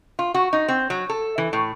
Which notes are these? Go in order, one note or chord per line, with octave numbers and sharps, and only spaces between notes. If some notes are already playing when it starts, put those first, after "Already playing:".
F4
F#4
D#4
C4
F#3
A4
E3
A2